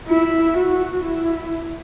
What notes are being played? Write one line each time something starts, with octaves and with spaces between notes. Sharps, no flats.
E4
F#4
E4